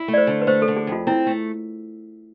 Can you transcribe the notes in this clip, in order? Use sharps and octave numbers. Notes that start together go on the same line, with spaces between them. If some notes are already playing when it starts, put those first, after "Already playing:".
Already playing: E4
A3
D5
C5
D3
B4
A3 C5
A4
D3
G#4
F2 F4
C4 E4
A3